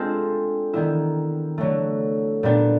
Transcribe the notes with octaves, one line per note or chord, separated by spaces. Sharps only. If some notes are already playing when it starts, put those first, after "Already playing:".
Already playing: G#3 C4 D4 F4 A4 C5
D#3 G3 B3 E4
D3 F#3 A3
A#2 G3 B3 D4